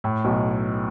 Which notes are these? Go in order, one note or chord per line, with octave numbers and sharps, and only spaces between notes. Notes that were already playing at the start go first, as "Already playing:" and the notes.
A2
B1 B2